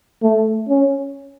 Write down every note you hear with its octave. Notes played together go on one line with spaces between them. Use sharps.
A3
C#4